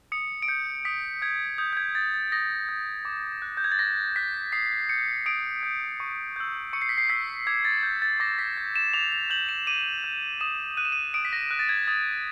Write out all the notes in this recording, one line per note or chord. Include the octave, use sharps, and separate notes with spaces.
D#6 C#7
D7
G6 C#7
D#6 B6
G6 G#6
D#6 G6
G6
G#6
G6 A6
A6
D#6 A#6
G6
D6
F#6
G6
G#6
A6
D6 A#6
F#6 B6
D#6 C7
G6 C#7
D#6 D7
G6
C#6
E6 G6
C#6 C#7
C7
B6
C7
E6 G6 B6
D6 G#6
A6
G6
A6
D6 A#6
B6
G6
E7
D6 F7
F7
G6 F#7
E7
D6 D#7
G6
D#6 E7
F#6 D#7
E7
D#7
D#6 D7
B6
A#6
F#6
A6
G#6
D#6 A6